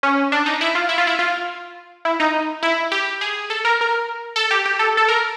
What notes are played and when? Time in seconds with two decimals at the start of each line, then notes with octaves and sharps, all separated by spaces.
0.03 C#4
0.32 D4
0.46 D#4
0.61 E4
0.75 F4
0.89 E4
0.98 F4
1.07 E4
1.19 F4
2.05 E4
2.20 D#4
2.63 E4
2.92 G4
3.21 G#4
3.50 A4
3.65 A#4
3.81 A#4
4.36 A4
4.51 G4
4.66 G4
4.79 A4
4.97 A4
5.08 A#4